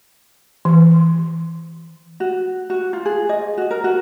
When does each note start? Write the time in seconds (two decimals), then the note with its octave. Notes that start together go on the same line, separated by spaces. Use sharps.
0.65 E3
2.20 F#4
2.70 F#4
2.93 F4
3.05 G#4
3.29 D#5
3.58 F#4
3.71 A#4
3.84 F#4